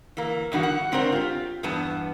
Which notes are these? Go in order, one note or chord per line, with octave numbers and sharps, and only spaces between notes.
E3 A#3
E2 G2 D#3 F#4
F#5
G#2 C4 D4 A#4 C5 C#5
F4 G4
E2 G2 B3 A5